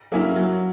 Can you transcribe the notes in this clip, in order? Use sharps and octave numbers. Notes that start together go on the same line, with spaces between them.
F#3 A#3 C#4 E4
F#3